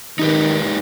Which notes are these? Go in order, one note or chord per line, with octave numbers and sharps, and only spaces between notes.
D#3 D#4 G4 B4